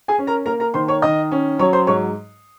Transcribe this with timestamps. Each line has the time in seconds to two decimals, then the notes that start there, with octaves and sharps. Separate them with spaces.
0.08 G#4 G#5
0.19 C#4
0.27 A#4 A#5
0.46 A#3 A#4 A#5
0.60 A#4 A#5
0.74 D#3 C5 C6
0.88 C#5 C#6
1.02 D#3 D#5 D#6
1.32 C#4
1.59 F#3 C#5 C#6
1.73 C5 C6
1.87 G#2 C#5 C#6